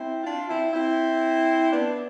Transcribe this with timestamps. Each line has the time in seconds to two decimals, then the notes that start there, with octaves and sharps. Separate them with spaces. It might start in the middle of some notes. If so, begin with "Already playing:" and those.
Already playing: C4 E4
0.24 D4 F4
0.48 C4 E4
0.73 C4 E4
1.72 B3 D4